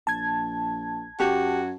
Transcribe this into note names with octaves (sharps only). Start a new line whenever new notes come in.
A#1 A5 G#6
F#2 F#4 G4